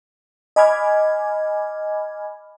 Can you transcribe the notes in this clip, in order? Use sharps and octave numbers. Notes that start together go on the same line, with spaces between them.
D#5 G#5 B5 D6 F6 G#6